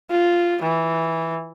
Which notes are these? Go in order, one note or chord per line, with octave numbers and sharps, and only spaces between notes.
F4
E3